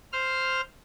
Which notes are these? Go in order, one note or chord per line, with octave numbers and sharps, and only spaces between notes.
C5 F6